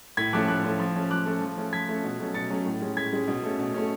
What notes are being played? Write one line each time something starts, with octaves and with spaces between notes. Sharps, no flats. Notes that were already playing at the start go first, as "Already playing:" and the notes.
A2 G#6 B6
F3 A3 C#4 D6 F#6
A2 D6 F#6
F3 A3 C#4
F3
A3 C#4
F3 D6 F#6
A3 C#4
F3
A3 C#4
F3 G#6 B6
A3 C#4
B2
F#3 A3 C#4
B2 A6 C#7
F#3 A3 C#4
A2
G#3 C#4
A2 G#6 B6
G#3 C#4
B2
A3 C#4
B2
A3 C#4